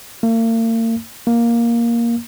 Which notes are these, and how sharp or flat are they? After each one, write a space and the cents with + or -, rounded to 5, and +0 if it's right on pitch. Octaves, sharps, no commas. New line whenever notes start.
A#3 -45
A#3 +5